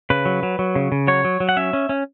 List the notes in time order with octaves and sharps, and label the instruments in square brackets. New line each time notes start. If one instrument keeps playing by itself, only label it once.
[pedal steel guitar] C#3 B4
F#3
F#3
F#3
C#3
C#3
F#3 C#5
F#3
F#3
F#5
C#4 E5
C#4
C#4